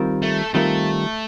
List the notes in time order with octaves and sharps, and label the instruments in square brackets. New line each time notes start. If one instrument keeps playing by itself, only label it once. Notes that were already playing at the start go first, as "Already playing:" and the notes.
Already playing: [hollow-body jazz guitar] D#3 G3 C4 F4 A#4
[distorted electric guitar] A3
[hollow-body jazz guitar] D#3 G3 C4 F4 A#4 [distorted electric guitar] A3